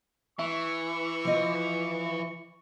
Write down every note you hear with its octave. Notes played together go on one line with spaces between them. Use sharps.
E3 E5 C#6
F3 D#5